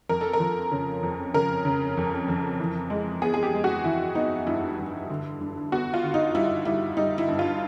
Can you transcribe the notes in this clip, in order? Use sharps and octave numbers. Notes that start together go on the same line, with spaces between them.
F2 A#4
A4
A#4
F3
C#3
F2
C#3 A#4
C#3
F2
F2
E3
G#3
B3 G#4
G#4
G4
G#3
F#4
E3 E4
B3 D#4
G2 E4
G2
D3
G2
B3 F#4
F4
D3
D#4
G3 E4
G3 E4
G3 D#4
E4
G2
F4